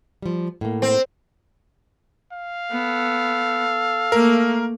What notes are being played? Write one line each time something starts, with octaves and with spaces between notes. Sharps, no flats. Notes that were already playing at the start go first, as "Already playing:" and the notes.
F3 G3
A2 A#3
C4
F5
B3 A4
A3 A#3 A#4